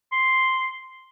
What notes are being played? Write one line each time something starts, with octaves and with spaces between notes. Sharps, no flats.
C6